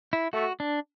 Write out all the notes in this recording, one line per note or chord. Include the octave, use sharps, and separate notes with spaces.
E4
A3 F#4
D4